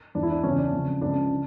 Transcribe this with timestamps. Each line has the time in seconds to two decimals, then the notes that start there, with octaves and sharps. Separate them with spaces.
0.15 E2 E3 D4
0.23 E4
0.32 D4
0.44 E2 C#3 E3 C#4
0.58 D4
0.72 F2 C#3 F3
1.01 C#2 C#3 F3 D4
1.31 D3